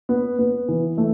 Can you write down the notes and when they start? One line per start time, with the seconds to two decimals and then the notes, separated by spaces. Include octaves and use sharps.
0.09 B3
0.39 B3
0.68 E3
0.98 A3